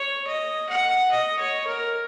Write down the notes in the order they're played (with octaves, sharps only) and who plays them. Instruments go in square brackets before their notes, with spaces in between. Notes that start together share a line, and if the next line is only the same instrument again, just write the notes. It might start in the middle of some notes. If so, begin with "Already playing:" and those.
Already playing: [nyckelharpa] C#5
D#5
F#5
D#5
C#5
A#4